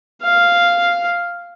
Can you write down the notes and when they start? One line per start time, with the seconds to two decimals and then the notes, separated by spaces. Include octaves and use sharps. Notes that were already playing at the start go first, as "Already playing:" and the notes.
0.23 F5